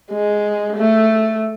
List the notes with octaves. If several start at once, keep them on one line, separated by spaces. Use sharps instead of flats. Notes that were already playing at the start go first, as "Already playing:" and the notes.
G#3
A3